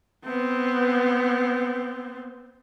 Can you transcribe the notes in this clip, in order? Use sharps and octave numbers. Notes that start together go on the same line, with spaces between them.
B3 C4